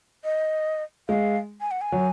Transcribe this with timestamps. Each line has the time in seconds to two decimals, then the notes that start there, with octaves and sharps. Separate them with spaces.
0.24 D#5
1.09 G#3 F5
1.61 G#5
1.71 F#5
1.81 G#5
1.92 F#3